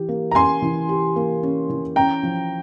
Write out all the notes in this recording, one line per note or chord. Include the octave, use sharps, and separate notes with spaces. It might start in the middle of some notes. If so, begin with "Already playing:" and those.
Already playing: E3 G4
A#3
A#5
C#4 G#5 C6
E3
G4
A#3
C#4
E3
C#4 G5 A#5
F3